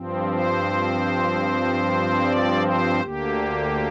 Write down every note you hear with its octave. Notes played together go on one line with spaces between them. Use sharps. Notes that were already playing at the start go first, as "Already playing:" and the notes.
Already playing: G2 F3 C4
C5
D5
C5
D2 D3 A#3 G4